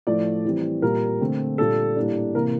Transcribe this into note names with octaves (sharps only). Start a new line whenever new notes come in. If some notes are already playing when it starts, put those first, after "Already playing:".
A2 F3 A3 D5
E3 G3 C4
A#2 G3 A#3 A#4
D3 A3 C4
A#2 G3 D4 A4
A2 G3 A#3 D4
C3 E3 A#3 A#4